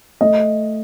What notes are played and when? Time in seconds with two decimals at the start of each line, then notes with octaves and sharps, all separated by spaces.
0.21 A3 D#5